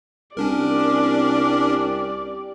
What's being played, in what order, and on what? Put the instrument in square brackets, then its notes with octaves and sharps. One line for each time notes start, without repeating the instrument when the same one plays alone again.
[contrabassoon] C2 [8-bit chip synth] C#4 D4 A#4 [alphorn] G4 [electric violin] D5